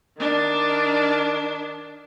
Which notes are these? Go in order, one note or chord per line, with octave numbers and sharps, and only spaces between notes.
D#3 D4